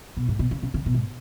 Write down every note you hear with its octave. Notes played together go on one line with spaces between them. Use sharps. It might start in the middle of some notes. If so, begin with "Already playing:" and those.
B2
G#2
B2
C#3
C#3
C#3
B2
G#2